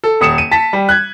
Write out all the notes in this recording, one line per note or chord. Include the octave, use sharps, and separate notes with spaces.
A4
D#1 D#6 C#7 E7
D#7
A5 B6
G3
F#6 G#6